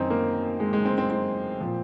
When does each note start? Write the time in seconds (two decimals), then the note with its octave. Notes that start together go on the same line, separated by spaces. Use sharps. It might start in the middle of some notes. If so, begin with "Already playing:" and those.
Already playing: F#2 D#3 C4 D#4
0.10 A#3
0.60 G#3
0.73 G#3
0.85 C4
0.98 C4
1.10 C4
1.60 A#2 F3